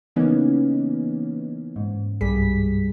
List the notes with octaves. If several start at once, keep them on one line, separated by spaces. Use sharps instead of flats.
C#3 E3 A#3 B3 C#4 D#4
G#2
C2 G2 G3 G#4 B6